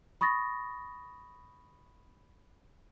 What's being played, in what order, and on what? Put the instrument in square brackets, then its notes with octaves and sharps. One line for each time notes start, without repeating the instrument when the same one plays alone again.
[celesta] B5 C#6 D#6 A6 A#6